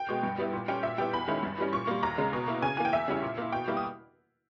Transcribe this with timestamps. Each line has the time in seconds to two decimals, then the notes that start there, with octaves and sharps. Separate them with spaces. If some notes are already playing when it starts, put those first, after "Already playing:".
Already playing: G5
0.09 B2 G#3
0.23 G2
0.38 G3 B3 E4
0.53 A#2
0.68 G3 C#4 G5
0.83 A#2 E5
0.98 G3 B3 E4 G5
1.13 E2 B5
1.28 D#3 G#3 C#4 E4
1.43 G2
1.58 E3 G3 C#4
1.73 A#2 C#6
1.87 G3 A#3
2.03 D#2 A#5
2.18 C#3 G#3
2.33 B2
2.48 A#3 E4
2.62 C#3 G#5
2.77 E3 A#3 G#5
2.85 G5
2.93 E2 E5
3.08 C#3 G3 C#4 E4
3.22 A#2
3.38 A#3 E4
3.52 B2 G5
3.67 G3 A#3 E4
3.77 D#6